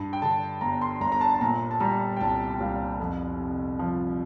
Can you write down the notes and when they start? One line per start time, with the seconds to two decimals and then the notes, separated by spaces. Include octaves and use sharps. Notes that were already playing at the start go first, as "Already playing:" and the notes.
Already playing: G2
0.13 G5
0.22 D3 A5
0.61 G1 A#5
0.81 C6
1.01 G1 A#5
1.12 A#5
1.21 A5
1.34 A5
1.41 A#2 A#5
1.71 A5
1.80 G3 A#5
2.17 G5
2.20 C2 A5
2.54 G5
2.60 C2 F5
2.99 F2
3.39 C3
3.79 F3